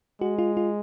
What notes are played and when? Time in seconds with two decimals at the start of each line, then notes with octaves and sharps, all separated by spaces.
0.21 G#3 F#4
0.39 F4
0.57 F4